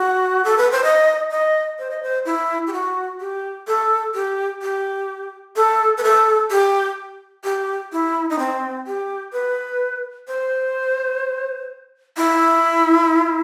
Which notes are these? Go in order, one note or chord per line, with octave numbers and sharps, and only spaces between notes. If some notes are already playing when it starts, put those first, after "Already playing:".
Already playing: F#4
A4
B4
C5
D#5
D#5
C5
D#5
C5
E4
G4
F#4
G4
A4
G4
G4
A4
B4
A4
G4
G4
E4
D#4
C4
G4
B4
C5
E4